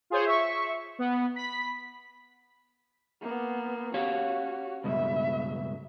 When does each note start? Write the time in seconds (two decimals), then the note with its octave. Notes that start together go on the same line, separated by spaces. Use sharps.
0.10 F4 G#4 C5 C#5
0.26 E5 C#6
0.99 B3
1.35 B5 B6
3.21 A#3 B3
3.94 C#4 F#4 G4 C#5 F5
4.84 C#2 G2 B2 E5